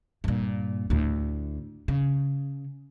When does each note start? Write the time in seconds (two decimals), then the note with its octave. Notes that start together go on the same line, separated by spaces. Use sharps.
0.24 G2 A#2
0.90 D2 A2
1.88 C#3